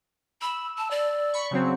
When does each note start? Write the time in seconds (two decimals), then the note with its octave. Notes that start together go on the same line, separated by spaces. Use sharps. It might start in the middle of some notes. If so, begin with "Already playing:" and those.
0.42 B5 E6
0.78 A5
0.91 D5
1.33 B5 C#6
1.51 C#3 F#3 C4